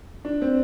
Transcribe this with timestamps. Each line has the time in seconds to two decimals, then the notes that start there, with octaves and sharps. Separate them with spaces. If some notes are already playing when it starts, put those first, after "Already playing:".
0.25 D4
0.42 C4